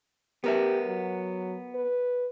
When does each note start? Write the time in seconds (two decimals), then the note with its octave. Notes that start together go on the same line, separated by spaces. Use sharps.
0.44 B3 G4 A#4 E5
0.87 F#3
1.75 B4